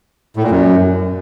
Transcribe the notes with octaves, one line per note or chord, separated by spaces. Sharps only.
A2
A#2
F#2